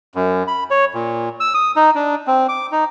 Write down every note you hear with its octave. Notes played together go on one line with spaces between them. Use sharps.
F#2
B5
C#5
A#2
E6
D#6
D#4
D4
C4
D6
D#4